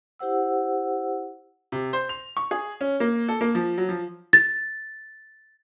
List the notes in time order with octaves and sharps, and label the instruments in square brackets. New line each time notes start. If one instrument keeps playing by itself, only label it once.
[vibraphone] E4 G4 C5 F#5 E6
[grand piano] C3
C5
F7
C#6
G#4
C#4
A#3
A4
A#3
F3
F#3
F3
[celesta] A6